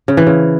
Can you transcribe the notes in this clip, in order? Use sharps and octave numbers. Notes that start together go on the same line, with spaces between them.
C#3
E3
C#3